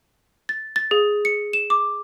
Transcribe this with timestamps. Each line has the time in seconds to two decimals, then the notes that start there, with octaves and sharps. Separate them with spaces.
0.49 A6
0.76 A6
0.91 G#4
1.25 C#7
1.53 E7
1.70 D6